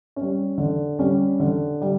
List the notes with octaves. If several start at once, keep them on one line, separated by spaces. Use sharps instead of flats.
G3 C#4
D3
G3 C#4
D3
G3